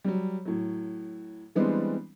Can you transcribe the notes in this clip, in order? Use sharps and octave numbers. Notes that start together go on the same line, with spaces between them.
F#3 G3
A2 F#3
E3 G3 G#3 B3 C4 D4